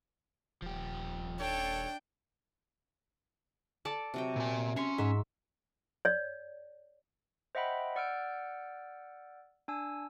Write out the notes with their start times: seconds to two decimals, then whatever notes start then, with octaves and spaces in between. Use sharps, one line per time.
0.62 D#1 F3 G4
1.40 D4 A4 C#5 G5
3.85 A4 D5 A5 D6
4.14 C3 F#3 G5
4.36 A#2 G#5
4.76 C#4 E5 A#5 C6 C#6 C7 C#7
4.98 G#2 E5
6.05 C#5 D5
7.55 C5 D#5 E5 F#5 G5 B5
7.96 D5 F#5 E6 F6 G6 D7
9.68 D4 G#5 E6